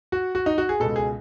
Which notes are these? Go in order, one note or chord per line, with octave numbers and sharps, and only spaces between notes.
F#4
F#4
D#4
F#4
G#4
C#2 B2 A4
G#4